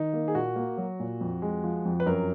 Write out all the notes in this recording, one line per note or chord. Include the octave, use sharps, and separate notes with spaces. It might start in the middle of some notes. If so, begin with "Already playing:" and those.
Already playing: D#3 D#4
A#3
G#4
A#2 F#4
A#3
F#3
A#2
F2
G#3
F3
F2
B4
F#2 A#4